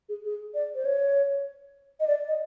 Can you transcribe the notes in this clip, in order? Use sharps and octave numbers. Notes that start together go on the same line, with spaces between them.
G#4
G#4
D5
C5
C#5
D#5
D5
D#5